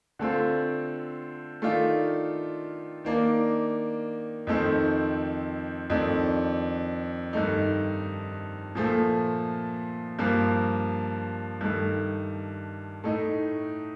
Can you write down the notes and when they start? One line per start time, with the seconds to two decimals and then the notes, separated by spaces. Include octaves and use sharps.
0.19 D3 A3 C4 F4
1.62 D#3 A3 D4 F4
3.05 D#3 A#3 D4
4.47 F2 D#3 A3 C4
5.90 F2 D#3 A3 D4
7.33 G2 D#3 A3 D#4
8.75 A#2 F3 A3
10.19 G2 F3 A#3
11.61 G2 D#3 A3
13.04 A2 A3 D#4